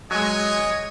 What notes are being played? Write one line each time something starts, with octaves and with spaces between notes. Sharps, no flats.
F#3 G#3 C#5 D#5 G#5